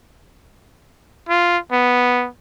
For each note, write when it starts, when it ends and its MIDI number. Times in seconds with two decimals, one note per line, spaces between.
1.29 1.58 65
1.72 2.27 59